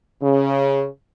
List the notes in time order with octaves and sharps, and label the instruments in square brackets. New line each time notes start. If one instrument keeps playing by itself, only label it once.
[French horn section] C#3